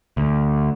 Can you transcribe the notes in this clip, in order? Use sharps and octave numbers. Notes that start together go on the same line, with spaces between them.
D2